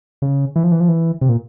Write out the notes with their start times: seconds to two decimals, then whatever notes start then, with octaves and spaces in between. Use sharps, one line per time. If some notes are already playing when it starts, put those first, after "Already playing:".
0.22 C#3
0.56 E3
0.63 F3
0.72 E3
0.80 F3
0.88 E3
1.21 C3
1.29 A#2